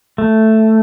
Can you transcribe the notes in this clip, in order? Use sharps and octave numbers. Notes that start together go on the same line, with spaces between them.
A3